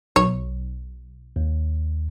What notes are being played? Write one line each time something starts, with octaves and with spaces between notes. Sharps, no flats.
B1 C#5
D#2